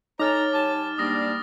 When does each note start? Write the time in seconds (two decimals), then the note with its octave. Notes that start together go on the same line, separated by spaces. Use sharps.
0.20 D#4 G#4 A4 C#5 A#5 D6 F6 A6
0.53 G3 G#5 A5 D6
0.98 G#2 G3 A#3 D4 D#6 A#6